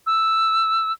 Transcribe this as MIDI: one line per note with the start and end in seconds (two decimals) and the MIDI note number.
0.07 0.92 88